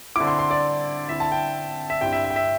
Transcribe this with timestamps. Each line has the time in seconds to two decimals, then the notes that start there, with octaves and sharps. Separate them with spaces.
0.16 D3 C4 E4 D6
0.27 C6
0.39 C6
0.51 D5
1.08 D3 C4 E4 E5
1.20 A5
1.32 G5
1.90 E5
2.01 G2 G3 C4 E4 G5
2.12 E5
2.25 E5
2.30 G5
2.36 E5